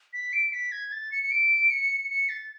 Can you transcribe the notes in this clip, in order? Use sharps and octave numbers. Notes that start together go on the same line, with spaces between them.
B6
D7
B6
G#6
A6
C#7
C#7
D7
C#7
C#7
A6